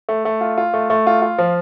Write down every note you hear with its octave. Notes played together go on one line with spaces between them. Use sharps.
A3
A3
F4
F4
A3
A3
F4
F4
F3